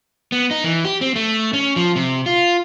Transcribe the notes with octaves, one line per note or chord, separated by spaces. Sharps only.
B3
D#4
E3
G4
C4
A3
C#4
F3
C3
F4